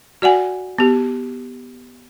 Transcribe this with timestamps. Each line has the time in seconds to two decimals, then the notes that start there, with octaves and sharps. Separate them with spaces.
0.22 F#4 D5 F#5 G#5
0.78 B3 G4